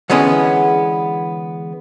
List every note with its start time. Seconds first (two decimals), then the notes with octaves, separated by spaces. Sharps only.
0.10 D3 E3 G#3 B3 C#4